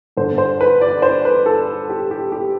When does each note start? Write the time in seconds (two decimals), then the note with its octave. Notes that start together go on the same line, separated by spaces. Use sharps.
0.17 G2 D3 C5
0.38 C5
0.61 B4
0.81 D5
1.02 C5
1.25 B4
1.46 A4
1.90 G4
2.11 G4
2.32 G4